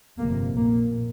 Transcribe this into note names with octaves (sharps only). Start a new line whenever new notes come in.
G1 F2 C3 A#3
A#1 A#2 A#3